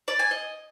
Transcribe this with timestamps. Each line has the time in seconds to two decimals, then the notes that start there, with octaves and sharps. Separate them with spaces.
0.08 D5
0.19 G#5
0.31 D#5